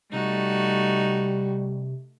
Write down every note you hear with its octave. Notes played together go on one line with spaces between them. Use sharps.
C3 G3 A3 D#4 F#4